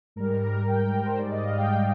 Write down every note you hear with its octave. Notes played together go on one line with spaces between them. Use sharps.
G#2 G3 A#4
A#4
G5
G5
A#4
C5
G#2 G3 D5
D#5
F5
G5